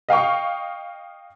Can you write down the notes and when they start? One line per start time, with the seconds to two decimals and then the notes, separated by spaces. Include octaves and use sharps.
0.09 D#5 F5 G5 C#6